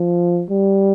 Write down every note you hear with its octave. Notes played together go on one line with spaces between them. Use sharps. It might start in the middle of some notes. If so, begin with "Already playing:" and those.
Already playing: F3
G3